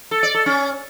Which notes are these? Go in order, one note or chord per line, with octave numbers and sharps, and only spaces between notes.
A4
D5
A4
C#4